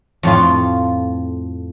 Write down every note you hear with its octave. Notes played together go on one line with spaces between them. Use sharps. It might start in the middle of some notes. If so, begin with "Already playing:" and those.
F2 A2 F4